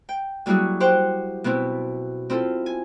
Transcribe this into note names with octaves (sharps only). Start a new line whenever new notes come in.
G5
F#3 G3 A#3 E4 F#4 G#4
G4 C5 F#5 G5
B2 B3 C4 E4
C4 E4 F4 A4
G#5